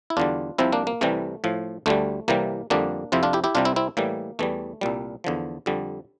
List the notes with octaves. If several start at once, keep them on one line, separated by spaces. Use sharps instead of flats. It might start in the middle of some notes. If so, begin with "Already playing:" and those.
E4
E2 D3 G3 D4 F4
C2 C3 F3 C4 E4
A#3 D4
A#3
C2 C3 E3 G3 A3
A2 F3
D2 D3 G3 A3
C2 C3 E3 G3 A#3
F2 D3 G3 A#3 D4
F2 C3 F3 C4 E4
D4 F4
E4 G4
E4 G4
C2 C3 G3 D4 F4
C4 E4
C4 E4
A2 E3 G3 A#3
E2 E3 G3 A3
C2 A#2 G3
E2 D3 F3
F2 D3 G3